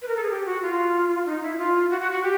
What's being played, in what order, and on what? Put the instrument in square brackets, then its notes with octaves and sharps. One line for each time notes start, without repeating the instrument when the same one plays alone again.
[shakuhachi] B4
A#4
A4
G#4
G4
F#4
F4
D#4
E4
F4
F#4
F#4
F#4
G4